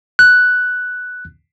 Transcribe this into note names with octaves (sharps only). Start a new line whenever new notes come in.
F#6